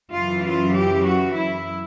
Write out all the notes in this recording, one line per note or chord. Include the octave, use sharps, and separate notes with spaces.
F#2 C#3 E3 F4
F4
G4
F#4
E4